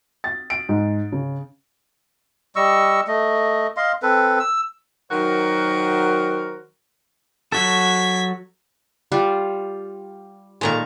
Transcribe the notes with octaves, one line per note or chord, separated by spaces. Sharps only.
A6
D7
G#2
C#3
G3 D#5 C#6 E6
A3 D#5
D#5 F5 C6
C4 A4 B4
E6
D#3 F#3 F#4 A#4 C5
F#3 F#4 A4 G#6 B6
G3 F4
A#2 D#3 G#3 A5 A#5 C#6